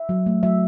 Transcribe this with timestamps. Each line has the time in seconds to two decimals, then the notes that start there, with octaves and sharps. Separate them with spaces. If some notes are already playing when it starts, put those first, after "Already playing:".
Already playing: E5
0.09 F#3
0.26 A3
0.43 F#3 E5